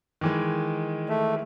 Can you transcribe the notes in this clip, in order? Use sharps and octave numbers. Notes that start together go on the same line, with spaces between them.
D#3 E3 G#3
A3